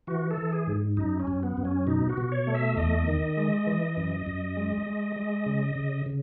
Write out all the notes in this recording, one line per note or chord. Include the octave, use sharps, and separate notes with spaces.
E3 F#4
A4
E3
G#4
G#2
F#2 D#4
C#4
F#2
B3
F#2
C#4
B2 D#4
F#4
B2
C#5
A3
E5
E2 D#5
D#3
G#3
E3
F#2
F#2
G#3
G#3
G#3
C#3
C#3
C#3